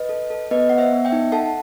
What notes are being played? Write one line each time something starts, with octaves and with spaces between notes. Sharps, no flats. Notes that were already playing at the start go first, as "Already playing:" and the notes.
Already playing: B4 D#5
A4
A4
B3 B4 D#5
B3 F#5
C5 E5
B3
E5 G5
D#4
A4 F#5 A5